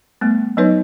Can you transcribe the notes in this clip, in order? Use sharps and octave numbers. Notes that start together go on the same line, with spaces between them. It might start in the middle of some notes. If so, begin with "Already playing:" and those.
G3 A3 B3
F#3 B3 D#4 B4 C#5 D#5